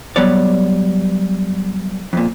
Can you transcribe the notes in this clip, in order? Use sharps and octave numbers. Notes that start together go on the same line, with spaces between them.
F#3 G3 B3 C#5 D5
F2 A#2